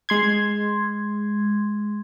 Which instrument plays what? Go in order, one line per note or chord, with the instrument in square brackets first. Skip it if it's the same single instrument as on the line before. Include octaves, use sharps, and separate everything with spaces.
[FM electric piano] G#3 C6 G#6